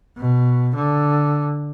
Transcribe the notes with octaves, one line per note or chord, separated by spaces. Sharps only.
B2
D3